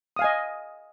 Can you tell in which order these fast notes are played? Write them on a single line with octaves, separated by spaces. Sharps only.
D#6 F5 G#5 D#5